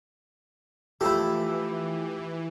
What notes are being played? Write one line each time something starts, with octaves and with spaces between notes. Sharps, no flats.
E3 F3 A3 E4 G4 A4 B5